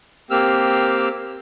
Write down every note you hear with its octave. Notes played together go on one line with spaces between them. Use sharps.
A#3 C4 G4 E6 F6